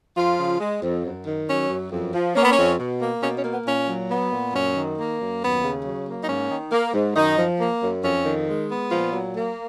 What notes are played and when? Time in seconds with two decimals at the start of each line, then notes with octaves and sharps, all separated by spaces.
0.17 F2 F3 F4
0.38 C#3
0.60 G#3
0.83 F2
1.05 F#2
1.27 D#3
1.48 F#3 C#4
1.70 F#2
1.92 F2
2.14 F3
2.35 A#3 C#4
2.43 B3
2.51 C#4
2.57 F2
2.79 B2
3.00 A#3
3.23 B2 C#4
3.37 C#4
3.44 A#3
3.52 B3
3.67 A#2 C#4
3.88 F#3
4.10 B3
4.32 A#2
4.54 F#2 C#4
4.75 D#3
4.98 A#3
5.20 F#2
5.42 D#2 B3
5.63 C#3
5.85 F#3
6.07 A#3
6.22 D#4
6.29 G#2 C#4
6.51 D#3
6.72 A#3
6.94 G#2
7.16 F#2 D#3 D#4
7.38 F3
7.60 A#3
7.82 F#2
8.04 F2 C#4
8.25 D#3
8.48 G#3
8.70 B3
8.91 A#2 F3 F4
9.13 F#3
9.35 A#3